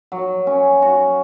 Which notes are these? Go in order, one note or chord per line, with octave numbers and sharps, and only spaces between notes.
F#3
C#4
F#4